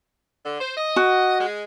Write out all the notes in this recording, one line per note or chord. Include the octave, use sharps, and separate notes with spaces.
D3
C5
D#5
F#4
G#3